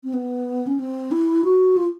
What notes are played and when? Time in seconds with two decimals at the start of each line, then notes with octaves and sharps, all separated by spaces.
0.04 C4
0.14 B3
0.67 C#4
0.79 C4
1.11 E4
1.44 F#4
1.77 F4